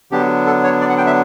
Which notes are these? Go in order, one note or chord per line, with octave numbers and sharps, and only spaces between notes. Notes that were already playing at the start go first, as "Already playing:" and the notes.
D3 F#3 B3 D4 G4
A4
C#5
D5
F#5
G5
E5